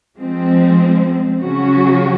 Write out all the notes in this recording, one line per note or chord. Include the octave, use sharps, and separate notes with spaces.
F3 G#3 C4
C#3 F#3 C#4 F#4